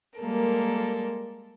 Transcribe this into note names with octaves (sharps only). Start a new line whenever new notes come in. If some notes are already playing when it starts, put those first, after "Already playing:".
G3 G#3 A#3 A4 A#4